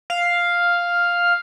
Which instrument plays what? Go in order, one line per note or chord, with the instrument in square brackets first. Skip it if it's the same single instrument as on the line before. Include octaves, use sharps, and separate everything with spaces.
[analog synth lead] F5